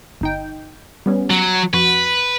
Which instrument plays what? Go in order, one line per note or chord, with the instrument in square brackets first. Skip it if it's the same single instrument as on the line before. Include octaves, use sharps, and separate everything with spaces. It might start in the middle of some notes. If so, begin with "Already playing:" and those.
[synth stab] G1 D#4 G5
G3 B3 C#4
[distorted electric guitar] F#3
[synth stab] F2 F#4 [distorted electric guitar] B4